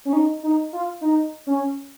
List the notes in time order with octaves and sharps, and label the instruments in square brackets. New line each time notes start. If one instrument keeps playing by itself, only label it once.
[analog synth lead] C#4
D#4
D#4
F4
D#4
C#4